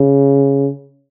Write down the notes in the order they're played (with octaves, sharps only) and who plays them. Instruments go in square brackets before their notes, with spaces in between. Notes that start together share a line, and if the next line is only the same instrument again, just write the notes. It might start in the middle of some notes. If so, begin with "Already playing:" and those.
Already playing: [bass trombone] C#3